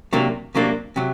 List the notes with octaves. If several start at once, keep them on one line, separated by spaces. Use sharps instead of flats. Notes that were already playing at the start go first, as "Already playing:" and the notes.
C3 F#3 A#3 D4
C3 F#3 A#3 D4
C3 F#3